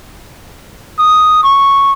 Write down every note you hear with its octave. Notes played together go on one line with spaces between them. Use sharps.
D#6
C#6